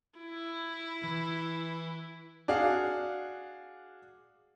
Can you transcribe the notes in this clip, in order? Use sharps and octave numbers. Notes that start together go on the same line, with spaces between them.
E4
E3
D4 F#4 G#4 F5